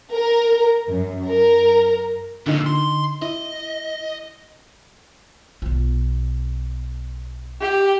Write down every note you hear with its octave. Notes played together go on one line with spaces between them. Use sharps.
A#4
F#2
A#4
F2 A#2 D3 D#4
C6
E4 D#5
B1 F4
G4